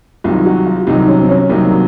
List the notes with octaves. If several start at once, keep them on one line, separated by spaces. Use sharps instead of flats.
C2 C3 D#3 F#3 F4
F#4
F4
C2 C3 D#3 F#3 D#4
D#4
C#4
C4
C#4
C2 C3 D#3 F#3 A#3
A#3